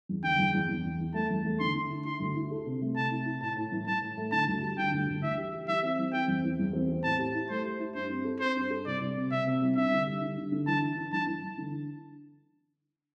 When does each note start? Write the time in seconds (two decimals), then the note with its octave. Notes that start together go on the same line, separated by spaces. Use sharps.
0.09 E2
0.23 D3 G5
0.38 E2
0.53 E2
0.69 E2
0.84 E2
0.99 E3
1.14 A3 A5
1.30 E2
1.45 A3
1.60 D3 C6
1.74 D3
1.90 E4
2.05 E4 C6
2.20 D2
2.36 E4
2.51 A4
2.66 C3
2.81 A3
2.96 C3 A5
3.11 E4
3.26 E4
3.41 A2 A5
3.57 A2
3.72 E3
3.86 E3 A5
4.02 A2
4.17 A3
4.32 D3 A5
4.48 D2
4.62 G3
4.78 D3 G5
4.92 D2
5.08 D2
5.22 E3 E5
5.38 G4
5.53 G4
5.68 E3 E5
5.83 C4
5.98 E3
6.13 C4 G5
6.28 E2
6.43 E3
6.59 E2
6.73 C4
6.88 C4
7.04 A2 A5
7.19 G4
7.34 E4
7.50 A3 C5
7.65 G4
7.79 E4
7.94 G2 C5
8.10 C4
8.24 A4
8.40 C4 C5
8.56 G2
8.70 A4
8.86 C2 D5
9.00 C2
9.16 C3
9.31 C3 E5
9.47 C3
9.61 C2
9.76 D4 E5
9.91 D3
10.06 G3
10.22 D3
10.37 D3
10.52 D3
10.67 E3 A5
10.82 D4
10.97 D4
11.12 E3 A5
11.27 E3
11.42 E3
11.58 D3